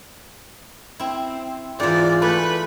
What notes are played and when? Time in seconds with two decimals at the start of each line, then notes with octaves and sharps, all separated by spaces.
0.99 C4 E4
1.80 G#2 E3 F4 D5
2.22 A3 B4